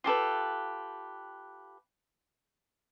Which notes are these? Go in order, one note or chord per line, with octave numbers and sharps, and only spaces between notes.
F4 G4 A4 B4